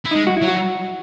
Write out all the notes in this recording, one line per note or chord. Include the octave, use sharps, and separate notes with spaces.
E4
G#3 D#4
F#4
E4
F#3
F#4